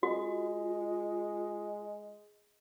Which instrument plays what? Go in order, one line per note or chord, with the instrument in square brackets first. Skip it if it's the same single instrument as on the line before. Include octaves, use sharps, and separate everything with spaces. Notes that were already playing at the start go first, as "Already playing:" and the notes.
[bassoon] G#3 [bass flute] F4 [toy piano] F#4